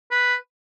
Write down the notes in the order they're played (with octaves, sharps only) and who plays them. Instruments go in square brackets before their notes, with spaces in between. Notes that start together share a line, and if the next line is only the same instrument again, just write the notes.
[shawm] B4